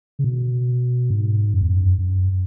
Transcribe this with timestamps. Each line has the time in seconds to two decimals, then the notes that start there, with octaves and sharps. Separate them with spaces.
0.19 C#3
0.24 B2
1.10 G#2
1.54 F#2
1.61 E2
1.69 F#2
1.98 F#2